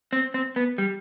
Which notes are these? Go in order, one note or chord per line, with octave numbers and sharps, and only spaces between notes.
C4
C4
B3
G3